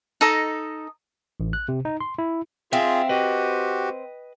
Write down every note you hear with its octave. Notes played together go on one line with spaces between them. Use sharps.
D#4 A4 D#5
A1
F#6
C3
D#4
C6
E4
C4 F4 G#4 E5 F5
F#4 G4 B4 D#5